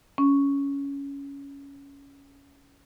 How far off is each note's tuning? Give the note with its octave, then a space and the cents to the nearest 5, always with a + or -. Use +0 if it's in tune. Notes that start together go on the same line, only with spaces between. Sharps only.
C#4 +10